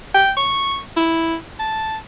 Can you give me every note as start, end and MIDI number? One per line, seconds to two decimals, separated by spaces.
0.15 0.32 79
0.37 0.78 85
0.96 1.35 64
1.59 1.97 81